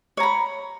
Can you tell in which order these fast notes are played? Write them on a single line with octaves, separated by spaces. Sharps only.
C#5 A#5 B5